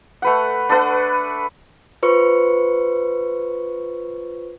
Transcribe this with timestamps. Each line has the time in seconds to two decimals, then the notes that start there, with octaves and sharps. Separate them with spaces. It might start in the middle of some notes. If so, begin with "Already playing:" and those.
0.22 A3 B4 F#5
0.69 D4 A4 B4 F#5
2.03 F4 B4 C5 C#6 C#7